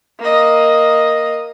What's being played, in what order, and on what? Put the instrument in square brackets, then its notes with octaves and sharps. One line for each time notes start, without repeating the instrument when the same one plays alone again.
[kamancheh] A#3 D#5